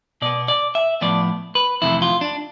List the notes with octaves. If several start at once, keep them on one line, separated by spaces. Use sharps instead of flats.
B2 B3 D5
D5
E5
A2 F3 B3 D5
B4
F2 C3 E3 A3 E4
F4
D4